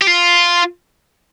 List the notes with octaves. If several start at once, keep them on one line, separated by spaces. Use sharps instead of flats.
G4
F4